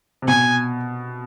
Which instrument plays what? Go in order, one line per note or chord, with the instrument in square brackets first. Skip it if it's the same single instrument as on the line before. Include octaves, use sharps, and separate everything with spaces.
[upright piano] C3
[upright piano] B2 [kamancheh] G#5